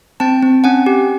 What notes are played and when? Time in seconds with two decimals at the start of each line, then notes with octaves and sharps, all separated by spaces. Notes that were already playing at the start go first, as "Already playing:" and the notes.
0.20 C4 G5 A5
0.43 C4
0.64 C#4 F#5 G#5
0.86 G4